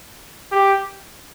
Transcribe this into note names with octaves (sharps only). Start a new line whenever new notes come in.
G4